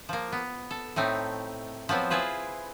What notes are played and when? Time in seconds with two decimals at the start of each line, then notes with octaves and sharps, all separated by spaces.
0.09 F3 A#3
0.32 B3
0.71 A4
0.96 A2 A3 C4 D#4
1.89 F3 F#3 B3 C4
2.10 E4 F4 G#4 B4 C5